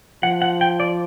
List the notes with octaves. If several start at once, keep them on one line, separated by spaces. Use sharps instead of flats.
F3 F#5
F#5
G5
D5